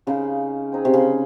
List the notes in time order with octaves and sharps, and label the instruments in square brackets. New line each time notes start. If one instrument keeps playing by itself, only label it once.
[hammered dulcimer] C#3 [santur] G#3 D#4 A#4 F5
[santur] C4 D#4 G#4
[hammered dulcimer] C3
C#3